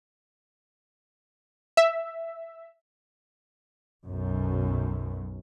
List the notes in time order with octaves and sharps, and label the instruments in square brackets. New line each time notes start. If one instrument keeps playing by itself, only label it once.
[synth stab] E5
[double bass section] B1 F#2